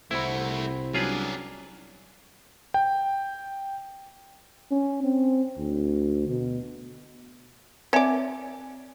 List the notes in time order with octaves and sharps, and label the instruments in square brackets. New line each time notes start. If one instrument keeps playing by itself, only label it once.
[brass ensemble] C2 [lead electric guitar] A3 F#4 [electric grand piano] C4 C5 B5 [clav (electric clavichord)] E4
[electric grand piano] F#3 G3 D4 [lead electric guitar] C#4 D5 [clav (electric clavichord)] F4 G#4 B4
[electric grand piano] G5
[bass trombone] C#4
C4
D2
B2
[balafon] C4 E5 G#5 [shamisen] C#5 D5